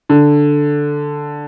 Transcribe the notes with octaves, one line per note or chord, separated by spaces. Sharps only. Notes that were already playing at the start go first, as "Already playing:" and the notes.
D3